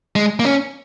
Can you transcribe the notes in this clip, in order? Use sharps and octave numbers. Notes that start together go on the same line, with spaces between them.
G#3
A#3
C#4